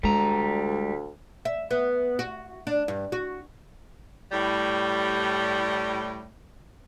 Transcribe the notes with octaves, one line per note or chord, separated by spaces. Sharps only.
D2 G3 G#3 A#5
E5
B3
F#4
D4
G2
F#4
A2 G3